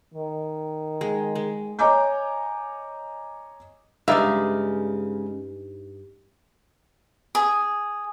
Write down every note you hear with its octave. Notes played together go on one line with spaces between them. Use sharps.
D#3
G#3
G#3
C#5 D#5 G#5 A#5 D6 G6
G2 C#3 G#3 D#4 D5 E5 F5
G#4